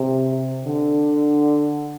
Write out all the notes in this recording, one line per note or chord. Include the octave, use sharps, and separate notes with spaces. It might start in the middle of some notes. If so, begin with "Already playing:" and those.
Already playing: C3
D3